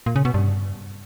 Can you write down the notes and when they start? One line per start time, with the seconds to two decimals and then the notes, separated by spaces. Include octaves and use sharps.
0.06 A#2
0.16 C#3
0.25 B2
0.34 G2